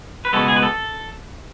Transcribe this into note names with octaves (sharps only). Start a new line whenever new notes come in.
B4
C#2 B2 G#3 B3 A4
G#4
B4
A4